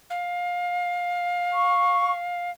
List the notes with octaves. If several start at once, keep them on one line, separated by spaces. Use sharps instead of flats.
F5
C#6